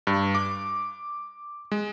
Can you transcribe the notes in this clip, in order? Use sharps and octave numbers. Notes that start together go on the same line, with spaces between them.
G2
D6
G#3